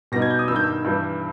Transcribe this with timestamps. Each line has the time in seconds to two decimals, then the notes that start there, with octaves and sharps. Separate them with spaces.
0.12 B2 G3 B3 D#4 A#6
0.22 G#6
0.30 G6
0.39 D#6
0.48 G2 D#3 G3 E6
0.56 G6
0.64 E6
0.85 G2 E3 G3